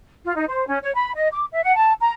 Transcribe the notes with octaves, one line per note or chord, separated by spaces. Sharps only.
F4
D#4
C5
C#4
C#5
B5
D#5
D6
E5
F#5
A5
A#5